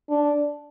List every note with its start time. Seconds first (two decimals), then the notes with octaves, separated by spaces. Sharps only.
0.09 D4